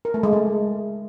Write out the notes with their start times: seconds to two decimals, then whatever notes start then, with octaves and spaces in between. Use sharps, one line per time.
0.05 A#4
0.14 A3
0.23 G#3
0.33 A3